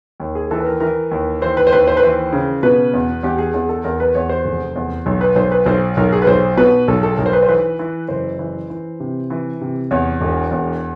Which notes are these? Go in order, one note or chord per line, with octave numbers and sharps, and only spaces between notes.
D#2
G#4
E3 A4
B4
A#4
E3 A#4
D#2
E3 C5
B4
C5
D#2 B4
C5
B4
E3 C5
C#3
B2 B4
E2
E2 G4
G#4
E2 G#4
A4
E2 A#4
B4
E2 C#5
C5
F1
E2
B1
B4
B1 C5
B4
B1 C5
B1 A#4
G#4
B4
B1 C5
B2 B4
B1 A4
A4
B1 A#4
C5
B4
C5
E3 B4
E3
F#1 C5
E3
E3
C3
E3
C3
E2 C#5
E1
E2